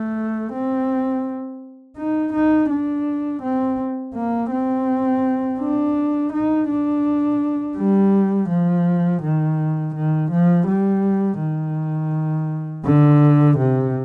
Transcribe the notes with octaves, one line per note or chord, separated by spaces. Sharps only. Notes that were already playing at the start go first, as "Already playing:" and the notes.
Already playing: A3
C4
D#4
D#4
D4
C4
A#3
C4
D4
D#4
D4
G3
F3
D#3
D#3
F3
G3
D#3
D3
C3